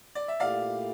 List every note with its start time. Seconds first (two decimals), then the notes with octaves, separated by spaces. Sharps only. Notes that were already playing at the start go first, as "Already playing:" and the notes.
0.15 D5
0.28 E5
0.40 A#2 A3 E4 G4 D5 F5